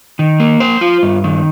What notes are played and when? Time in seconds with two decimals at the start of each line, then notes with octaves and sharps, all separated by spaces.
0.19 D#3
0.40 A#3
0.60 C5
0.81 F4
1.03 G2
1.24 D#3